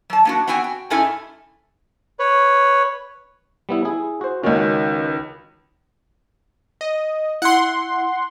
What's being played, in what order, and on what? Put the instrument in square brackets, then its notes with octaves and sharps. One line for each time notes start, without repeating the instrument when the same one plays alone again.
[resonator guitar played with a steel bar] F#3 A5
A#3 D4 F#4
B3 C4 F#4 G5 G#5
G5
G#2 G#3 C#4 E4 A4 G#5
[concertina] B4 C#5
[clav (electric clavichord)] G3 B3 E4
E4 G#4
F#4 C5
[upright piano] C#2 D#3 [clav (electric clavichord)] C#4 F#4
[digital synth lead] D#5
[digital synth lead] E4 [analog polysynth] F#5 C6